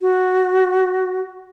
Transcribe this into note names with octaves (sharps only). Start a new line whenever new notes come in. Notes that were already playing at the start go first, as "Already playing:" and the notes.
F#4